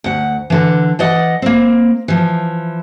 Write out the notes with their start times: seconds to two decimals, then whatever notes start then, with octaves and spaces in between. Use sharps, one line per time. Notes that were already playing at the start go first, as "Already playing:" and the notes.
0.04 D2 F#5
0.50 D3 E3
0.99 E3 D5 D#5 F#5
1.42 A#3 C4
2.08 E3 F3